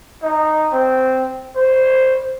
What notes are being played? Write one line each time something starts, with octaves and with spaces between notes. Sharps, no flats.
D#4
C4
C5